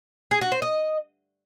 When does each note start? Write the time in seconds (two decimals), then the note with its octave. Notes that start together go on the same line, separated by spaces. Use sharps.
0.31 G#4
0.41 F#4
0.52 C5
0.62 D#5